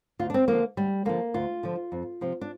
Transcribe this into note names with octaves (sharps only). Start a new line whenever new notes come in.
D2 F4
D4
C4
D3 F3 A#3
D2 G3
D3 F3 A#3
D2 F4
D3 F3
F2
C3 F3
D4